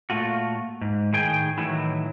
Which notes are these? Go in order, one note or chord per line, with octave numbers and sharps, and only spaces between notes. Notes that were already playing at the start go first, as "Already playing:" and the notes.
A#2 D#3 A3 F4 F#4
G#2
A2 D#3 G#4 G5 G#5
A2 D#3 E3 F#3 E4